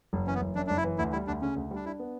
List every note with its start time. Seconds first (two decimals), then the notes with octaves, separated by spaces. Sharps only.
0.13 F#1
0.27 E3 C#4
0.34 B3
0.41 F#1
0.55 F#2 D4
0.67 F#1 D4
0.77 E4
0.84 E3
0.98 D2 E4
1.13 G3 E4
1.27 D2 D4
1.42 C#3 C#4
1.56 D2
1.71 G3 D4
1.86 D4 E4
1.99 B3